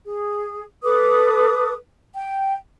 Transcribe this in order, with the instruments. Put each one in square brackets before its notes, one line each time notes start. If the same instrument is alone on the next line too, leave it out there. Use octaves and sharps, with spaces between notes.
[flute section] G#4
A4 B4 D6 D#6
G5